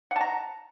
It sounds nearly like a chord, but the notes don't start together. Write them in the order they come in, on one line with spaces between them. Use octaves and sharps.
F#5 A5 A#5